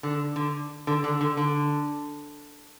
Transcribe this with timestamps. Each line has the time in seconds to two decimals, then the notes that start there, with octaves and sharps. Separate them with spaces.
0.03 D3
0.36 D3
0.87 D3
1.04 D3
1.21 D3
1.37 D3